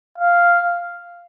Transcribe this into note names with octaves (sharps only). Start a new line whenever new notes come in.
F5